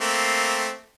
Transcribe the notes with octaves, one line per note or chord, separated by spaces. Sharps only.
A3 A#3 C4